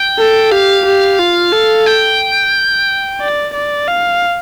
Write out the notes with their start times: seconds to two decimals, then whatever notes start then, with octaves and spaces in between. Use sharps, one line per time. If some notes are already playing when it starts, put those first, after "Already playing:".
Already playing: G5
0.19 A4
0.52 G4 F5
0.85 G4
1.19 F4
1.53 A4
1.86 G5
3.21 D5
3.54 D5
3.88 F5